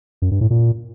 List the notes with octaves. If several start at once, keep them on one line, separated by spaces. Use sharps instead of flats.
F#2
G2
A2
A#2